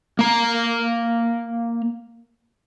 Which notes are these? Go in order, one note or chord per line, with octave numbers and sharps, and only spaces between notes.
A#3 A#5